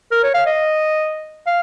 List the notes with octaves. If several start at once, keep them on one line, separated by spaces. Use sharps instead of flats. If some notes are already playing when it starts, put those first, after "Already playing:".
A#4
C#5
F5
D#5
F5